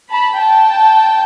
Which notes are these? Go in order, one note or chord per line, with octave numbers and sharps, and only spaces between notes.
A5 B5
G5 A5